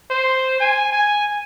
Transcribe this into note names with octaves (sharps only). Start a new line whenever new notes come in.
C5
G#5
G#5